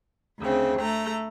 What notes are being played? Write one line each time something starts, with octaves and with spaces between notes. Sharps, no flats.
D2 C#3 C4
A3 A#5